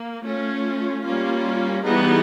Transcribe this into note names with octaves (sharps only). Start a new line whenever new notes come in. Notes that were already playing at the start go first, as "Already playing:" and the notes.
Already playing: A#3
A3 C#4 F4
G3 A#3 C#4 F4
E3 G3 B3 D#4 G#4